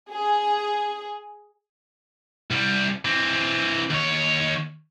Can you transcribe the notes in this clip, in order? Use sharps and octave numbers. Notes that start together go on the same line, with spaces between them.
G#4
C2 G3
E3 C4
D#2 C#5